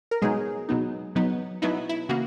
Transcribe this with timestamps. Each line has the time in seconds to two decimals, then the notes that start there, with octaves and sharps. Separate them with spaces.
0.11 A#4
0.22 B2 F#3 G#3 B3 D#4 G#4
0.69 B2 F#3 B3 D#4
1.15 B2 F#3 B3 D#4
1.62 B2 F#3 B3 D#4 E4
1.89 E4
2.09 C#3 E3 A#3 F#4